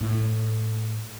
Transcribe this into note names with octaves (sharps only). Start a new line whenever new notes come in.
A2